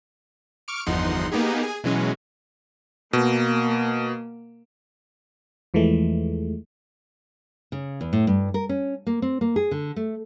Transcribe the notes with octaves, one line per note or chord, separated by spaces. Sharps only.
C#6 D6 F6 D7
G1 E2 F3 D#4 F#5 C6
A#3 B3 D#4 G4 G#4
G#4 G#5
B2 E3 F#3 G#3 C#4
B2 A#3
E2 E3 F3 G#3 A3
C#3
E2
A2
G2
A#4
C#4
A#3
C4
A#3
G#4
D3
A3